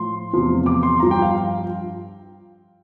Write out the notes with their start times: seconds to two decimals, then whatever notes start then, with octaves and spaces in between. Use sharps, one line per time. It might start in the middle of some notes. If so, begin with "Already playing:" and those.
Already playing: A2 F3 C6
0.33 E2 C3 F3
0.66 D6
0.83 C6
1.00 G2 F3 A#5
1.11 G5
1.22 F5